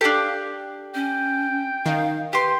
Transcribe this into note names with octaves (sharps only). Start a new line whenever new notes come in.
D4 G4 A4 F5
C#4 G5
D#3 F5
G4 B4 C6